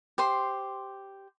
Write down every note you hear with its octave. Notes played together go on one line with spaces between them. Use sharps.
G4 C5 C6